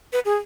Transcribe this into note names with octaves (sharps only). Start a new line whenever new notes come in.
B4
G#4